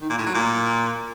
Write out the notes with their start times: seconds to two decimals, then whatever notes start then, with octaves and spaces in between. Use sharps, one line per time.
0.01 D#3
0.10 A#2
0.18 A2
0.26 F#3
0.35 A#2